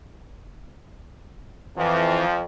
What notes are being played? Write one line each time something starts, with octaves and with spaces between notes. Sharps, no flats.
F2 E3 F3